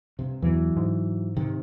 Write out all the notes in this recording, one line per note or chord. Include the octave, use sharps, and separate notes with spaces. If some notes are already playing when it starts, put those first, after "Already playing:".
G2 C3
E2 E3 F#3
G#2
C3 D#3